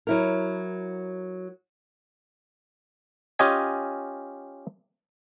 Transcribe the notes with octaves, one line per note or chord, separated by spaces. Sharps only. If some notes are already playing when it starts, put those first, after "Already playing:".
F#3 E4 A#4
C#4 F4 G4 D#5 G#5